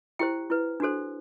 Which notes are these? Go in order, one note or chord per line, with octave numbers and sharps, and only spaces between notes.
E4 G4 C5 G5
E4 B4
D4 F#4 A4 C5